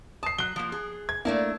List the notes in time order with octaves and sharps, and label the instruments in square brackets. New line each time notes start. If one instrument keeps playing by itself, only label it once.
[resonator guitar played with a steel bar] A5 [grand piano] D#6 C7
[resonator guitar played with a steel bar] F#3 [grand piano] F#6 G7
[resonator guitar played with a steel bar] F3 A#3
G#4
[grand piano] G#6
[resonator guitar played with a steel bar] A3 D4 E4 [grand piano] A#3